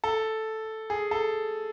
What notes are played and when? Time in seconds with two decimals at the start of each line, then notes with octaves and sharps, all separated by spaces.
0.04 A4
0.90 G#4
1.11 A4